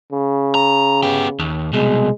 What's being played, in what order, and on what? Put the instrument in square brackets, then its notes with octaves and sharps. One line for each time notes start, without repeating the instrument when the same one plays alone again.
[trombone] C#3
[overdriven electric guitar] A#5
B3 G4
D#2
[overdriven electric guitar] C2 B2 [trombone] G#3